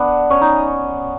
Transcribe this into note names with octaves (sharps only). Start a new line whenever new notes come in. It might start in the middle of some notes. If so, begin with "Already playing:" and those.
Already playing: B3 D4
C#4
D#4